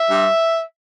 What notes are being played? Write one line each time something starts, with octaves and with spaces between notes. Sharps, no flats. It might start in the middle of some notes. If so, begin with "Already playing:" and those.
Already playing: E5
G2